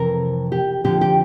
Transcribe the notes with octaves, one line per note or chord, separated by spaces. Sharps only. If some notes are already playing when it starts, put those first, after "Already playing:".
Already playing: F2 C3 E3 A#4
G4
F2 D3 F3 G4
G4